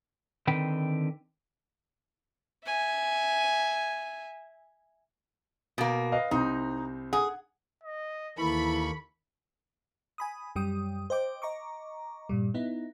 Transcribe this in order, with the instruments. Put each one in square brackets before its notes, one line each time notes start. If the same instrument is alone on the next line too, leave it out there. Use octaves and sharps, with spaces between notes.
[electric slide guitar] D3 D#3 C4 B4 G5
[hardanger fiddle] E5 G#5
[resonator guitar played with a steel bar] B2 A#3
[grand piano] B4 D#5 F5
[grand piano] C2 C4 [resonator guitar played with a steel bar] D#4
[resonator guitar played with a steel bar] G#4 [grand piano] F#5
[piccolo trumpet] D#5
[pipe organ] D#2 A#3 C#6 [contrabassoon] E3 [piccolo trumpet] A4 [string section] B5
[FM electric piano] G#5 B5 D#6
F#2 G3 G5 D#6
C5 D#5 G5 D6
D#5 A#5 C#6 D6
G2 A#2 G3
B3 D#4 E4